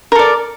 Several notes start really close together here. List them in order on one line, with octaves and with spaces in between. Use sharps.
A#4 A4 D5